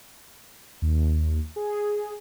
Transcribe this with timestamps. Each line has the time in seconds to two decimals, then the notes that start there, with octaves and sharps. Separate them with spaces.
0.82 D#2
1.56 G#4